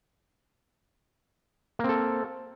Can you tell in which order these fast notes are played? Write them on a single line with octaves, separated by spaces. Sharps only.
A#3 C4 A4